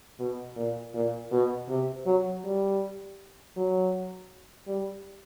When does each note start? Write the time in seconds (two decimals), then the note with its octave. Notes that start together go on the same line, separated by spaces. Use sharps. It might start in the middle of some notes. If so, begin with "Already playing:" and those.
0.19 B2
0.56 A#2
0.94 A#2
1.32 B2
1.69 C3
2.06 F#3
2.44 G3
3.57 F#3
4.68 G3